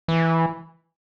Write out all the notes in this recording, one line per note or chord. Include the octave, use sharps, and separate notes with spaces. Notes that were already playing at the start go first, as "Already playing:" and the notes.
E3